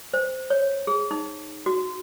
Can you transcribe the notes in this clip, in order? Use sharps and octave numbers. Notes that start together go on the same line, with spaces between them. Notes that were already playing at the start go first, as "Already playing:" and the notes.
C5
C#5
G#4
D#4
F#4